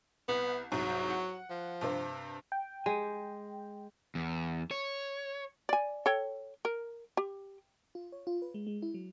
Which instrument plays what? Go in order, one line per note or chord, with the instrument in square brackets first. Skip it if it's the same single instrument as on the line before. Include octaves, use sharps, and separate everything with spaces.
[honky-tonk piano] C2 [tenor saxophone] B3
[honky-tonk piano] C2 G#2 [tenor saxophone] F#3
[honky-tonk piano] F#5
[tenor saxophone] F3
[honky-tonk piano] G2 C3 C4
[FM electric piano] G5
[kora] G#3 [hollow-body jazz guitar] G#5
[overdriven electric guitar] E2
C#5
[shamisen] D5 G#5
A4 C#5 G5
A#4
G4
[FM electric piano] F4
C#5
F4
B4
G#3
G#3
E4
F#3